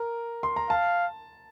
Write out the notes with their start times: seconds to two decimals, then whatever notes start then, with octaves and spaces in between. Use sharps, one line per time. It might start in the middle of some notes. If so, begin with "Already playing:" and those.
Already playing: A#4
0.43 C6
0.56 A#5
0.70 F5 A5